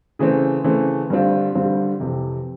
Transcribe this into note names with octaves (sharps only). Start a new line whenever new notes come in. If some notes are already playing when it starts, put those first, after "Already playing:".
C#3 E3 A3 C4
C#3 E3 A3 C4
G2 D3 G3 C4 F4
G2 D3 G3 C4 F4
F2 C3 E3